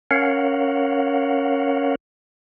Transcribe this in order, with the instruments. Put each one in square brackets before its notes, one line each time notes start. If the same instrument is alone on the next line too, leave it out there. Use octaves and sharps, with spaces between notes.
[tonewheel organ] C#4 A#4 C#5 F5 F#5